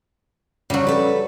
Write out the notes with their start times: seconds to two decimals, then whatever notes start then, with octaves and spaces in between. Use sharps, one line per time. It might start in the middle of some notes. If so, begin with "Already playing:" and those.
0.70 C#3 F#3 G3
0.87 A4 B4